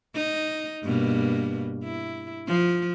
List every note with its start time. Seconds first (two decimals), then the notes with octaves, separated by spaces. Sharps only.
0.14 D#4
0.83 G2 B2 A#3
1.84 E4
2.48 F3